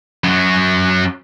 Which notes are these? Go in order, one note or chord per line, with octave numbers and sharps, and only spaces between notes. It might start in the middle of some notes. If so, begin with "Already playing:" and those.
F#2 F#3